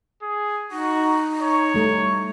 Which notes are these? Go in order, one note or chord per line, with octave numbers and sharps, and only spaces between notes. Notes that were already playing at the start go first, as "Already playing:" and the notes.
G#4
D#4 F#4
C#5
G3 A3